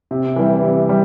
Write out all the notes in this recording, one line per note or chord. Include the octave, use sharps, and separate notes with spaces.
C3
E3 G3
C3
G3